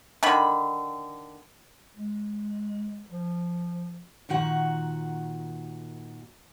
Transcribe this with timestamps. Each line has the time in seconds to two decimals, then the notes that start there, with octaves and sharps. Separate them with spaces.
0.23 D3 D#3 B5
1.96 G#3
3.10 F3
4.29 A#2 D#3 F#4 F#5